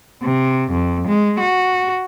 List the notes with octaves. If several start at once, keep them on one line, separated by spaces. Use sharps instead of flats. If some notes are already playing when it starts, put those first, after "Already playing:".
C3
F2
G#3
F#4